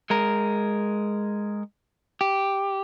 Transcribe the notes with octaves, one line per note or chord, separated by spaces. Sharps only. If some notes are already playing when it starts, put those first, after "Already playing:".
G#3 A#4
G4